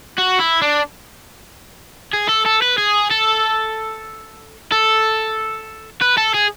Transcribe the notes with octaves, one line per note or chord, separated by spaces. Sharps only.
F#4
E4
D4
G#4
A4
A4
B4
G#4
A4
A4
B4
A4
G#4